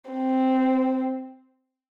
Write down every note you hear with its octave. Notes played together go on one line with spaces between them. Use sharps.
C4